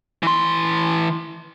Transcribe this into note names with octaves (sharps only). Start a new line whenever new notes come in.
E3 C6